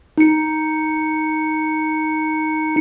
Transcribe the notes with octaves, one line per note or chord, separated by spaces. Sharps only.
D#4 C#7